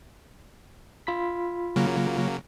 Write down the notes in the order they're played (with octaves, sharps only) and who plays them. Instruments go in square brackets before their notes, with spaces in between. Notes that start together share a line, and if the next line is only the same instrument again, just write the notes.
[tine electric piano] F4 B5 B6
[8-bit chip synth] C#3 F#3 A#3